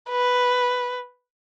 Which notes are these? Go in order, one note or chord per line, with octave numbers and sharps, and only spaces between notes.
B4